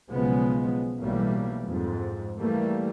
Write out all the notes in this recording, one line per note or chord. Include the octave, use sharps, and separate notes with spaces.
B1 C#3 F3 G#3 B3
B1 A2 E3 G3 A#3
F2 G#2
E3 G3 A3 A#3